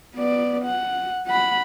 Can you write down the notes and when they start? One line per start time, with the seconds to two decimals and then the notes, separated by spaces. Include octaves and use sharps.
0.15 B3 D5
0.65 F#5
1.27 F#5 B5